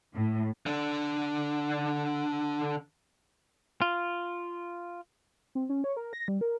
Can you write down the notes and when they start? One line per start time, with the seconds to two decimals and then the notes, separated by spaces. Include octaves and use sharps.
0.12 A2
0.66 D3 D4
3.82 F4
5.55 C4
5.69 C#4
5.84 C#5
5.97 A#4
6.13 A#6
6.28 G3
6.41 A#4